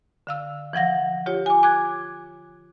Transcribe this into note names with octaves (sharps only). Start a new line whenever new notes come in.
D3 F5 E6
E3 F3 F#5 A#6
F4 G4 C#5
G#5 D6
D6 F#6 G#6